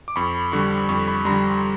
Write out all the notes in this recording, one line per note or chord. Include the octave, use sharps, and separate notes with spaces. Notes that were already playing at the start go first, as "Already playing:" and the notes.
D6
F2 B5 C#6
D3 G3 B5 C#6
F2 B5 C#6
B5 C#6
D3 G3 A#5 C6